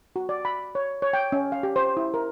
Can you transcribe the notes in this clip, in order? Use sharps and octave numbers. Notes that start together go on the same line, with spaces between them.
F#4
D5
B5
C#5
C#5
G5
C#4
F5
G4
C5
E4
A#4